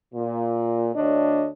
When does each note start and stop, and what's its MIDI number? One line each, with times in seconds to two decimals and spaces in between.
0.14 0.88 46
0.96 1.47 38
0.96 1.47 50
0.96 1.47 62
0.96 1.47 73
0.96 1.47 75